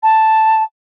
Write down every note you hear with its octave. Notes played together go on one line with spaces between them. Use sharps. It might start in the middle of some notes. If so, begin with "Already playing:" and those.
A5